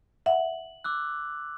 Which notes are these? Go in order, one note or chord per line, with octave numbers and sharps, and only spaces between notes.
E5 F#5 F#7
D6 E6 F#6